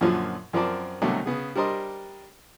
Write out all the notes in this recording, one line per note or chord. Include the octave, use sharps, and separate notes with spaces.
F#2 A#2 D3 F3 F#3
F#2 F3 C4 A#4 D5 A5
C2 B2 D3 F#3 A3 A#4
C#3 B3 G#4
G3 D4 A#4 C5 D#5